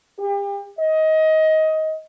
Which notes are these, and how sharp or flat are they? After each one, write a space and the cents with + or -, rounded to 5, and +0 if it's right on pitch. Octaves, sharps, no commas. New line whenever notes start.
G4 +35
D#5 +20